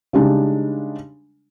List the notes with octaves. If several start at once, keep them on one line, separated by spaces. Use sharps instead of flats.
C#3 G3 G#3 D4 D#4